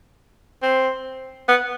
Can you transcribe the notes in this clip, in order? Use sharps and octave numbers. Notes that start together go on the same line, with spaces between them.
C4
B3